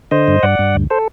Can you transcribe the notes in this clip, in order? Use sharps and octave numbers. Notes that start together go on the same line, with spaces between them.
D3 C5 D#5
G2
G2 D5 F#5
G2
D2
A4 C5